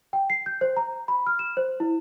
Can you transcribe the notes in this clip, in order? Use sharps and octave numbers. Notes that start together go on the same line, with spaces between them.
G5
C7
G6
C5
A#5
B5
F6
E7
C5
E4